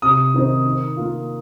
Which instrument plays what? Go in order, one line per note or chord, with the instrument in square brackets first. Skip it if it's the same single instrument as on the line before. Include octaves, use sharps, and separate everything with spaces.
[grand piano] C3 D#6
D#3 C4 D#4
D#3
A#3 F4